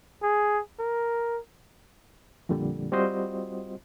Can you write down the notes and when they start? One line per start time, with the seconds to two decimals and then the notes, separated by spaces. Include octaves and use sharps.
0.23 G#4
0.79 A#4
2.49 F2 A#2 D3 G3
2.92 G3 C4 F4 F#4 C5 D#5